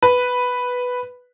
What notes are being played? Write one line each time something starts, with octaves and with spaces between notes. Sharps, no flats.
B4